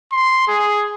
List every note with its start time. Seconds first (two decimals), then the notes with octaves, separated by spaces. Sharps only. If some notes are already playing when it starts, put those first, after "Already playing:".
0.12 C6
0.48 G#4